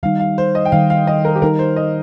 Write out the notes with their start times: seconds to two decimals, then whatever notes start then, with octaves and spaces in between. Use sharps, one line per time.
0.03 D#3 G3 D#4 F5
0.20 F5
0.38 C5
0.55 D#5
0.66 G5
0.72 D#3 G3 D#4 F5
0.90 F5
1.07 D#5
1.25 A#4
1.36 G4
1.42 D#3 G3 D#4 A#4
1.59 C5
1.76 D#5